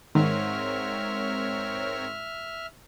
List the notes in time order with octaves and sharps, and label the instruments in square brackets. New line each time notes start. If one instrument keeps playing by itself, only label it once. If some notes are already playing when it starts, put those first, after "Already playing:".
[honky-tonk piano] G#2 [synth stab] D#3 [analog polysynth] C4 A#4 C#5 [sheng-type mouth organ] E5 F6